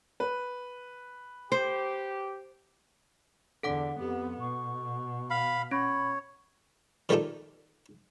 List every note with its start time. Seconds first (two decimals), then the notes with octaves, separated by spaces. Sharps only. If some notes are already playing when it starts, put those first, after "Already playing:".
0.20 B4
1.52 G4 C5
3.63 E2 D3 A4 F#5 D6
3.99 F2 B3 G4
4.40 B2 C#6
5.30 F5 B5
5.71 C#4 C#5 B5
7.09 D#3 G3 A#3 F4 G4 A4